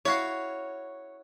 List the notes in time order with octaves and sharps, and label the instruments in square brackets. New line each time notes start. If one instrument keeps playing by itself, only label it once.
[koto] E4 F#4 F5 [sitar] C#5